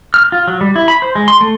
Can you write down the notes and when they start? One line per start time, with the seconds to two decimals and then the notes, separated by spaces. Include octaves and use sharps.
0.14 F6
0.32 F4
0.48 F#3
0.61 G3
0.76 E4
0.88 B5
1.02 C5
1.15 G#3
1.28 C6
1.41 A3